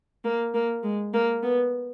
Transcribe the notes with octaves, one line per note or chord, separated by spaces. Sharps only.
A#3
A#3
G#3
A#3
B3